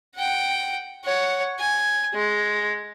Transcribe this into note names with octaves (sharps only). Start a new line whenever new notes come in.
F#5 G5
C#5 F#5
G#5
G#3